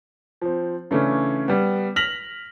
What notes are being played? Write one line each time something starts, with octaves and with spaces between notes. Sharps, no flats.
F3 C4
C#3 E3 A3 C#4 D4
G3 B3
F6 A#6 B6 F7 F#7